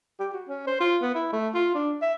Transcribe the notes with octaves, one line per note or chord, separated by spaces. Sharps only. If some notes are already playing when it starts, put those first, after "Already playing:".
G4
F#4
C#4
C5
F4
B3
E4
A3
F4
D4
E5